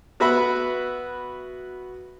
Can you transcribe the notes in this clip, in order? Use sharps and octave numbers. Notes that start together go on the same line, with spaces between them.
B3 F#4 B4 E5 B5